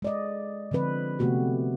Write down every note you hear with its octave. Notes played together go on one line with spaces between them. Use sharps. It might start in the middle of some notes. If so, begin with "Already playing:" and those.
G#3 D5 D#5
D3 F3 C4 B4
C3 A3 B3 F#4 G4